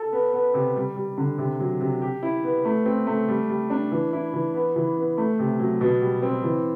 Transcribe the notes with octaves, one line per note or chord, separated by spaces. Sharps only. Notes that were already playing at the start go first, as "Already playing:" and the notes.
Already playing: A4
B3
B3
C3
G3
G3
D3
C3
F#3
C3
G4
E4
B3
A3
C4
A3
G3
G3
D4
E3
E4
E3
B3
E3
B3
A3
C3
F#3
B2
G3
C4
E3